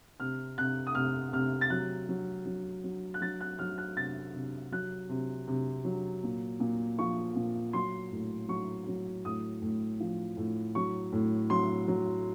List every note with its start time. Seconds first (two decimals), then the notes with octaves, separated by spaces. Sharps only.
0.20 C3 F6
0.58 C3 F#6
0.87 D#6
0.95 C3 F6
1.33 C3 F6
1.61 A6
1.70 F#3 F#6
2.09 F#3
2.46 F#3
2.84 F#3
3.14 F#6
3.21 F#3 A6
3.40 F#6
3.59 F#3 F6
3.78 F#6
3.97 C3 A6
4.34 C3
4.72 F#3 F#6
5.09 C3
5.47 C3
5.85 F#3
6.23 A#2
6.60 A#2
6.99 F3 C#6
7.36 A#2
7.73 F#3 C6
8.12 A2
8.48 F#3 C#6
8.87 F#3
9.25 A2 D#6
9.62 A2
10.00 F3
10.37 A2
10.75 F#3 C#6
11.12 A2
11.50 F#3 C6
11.88 F#3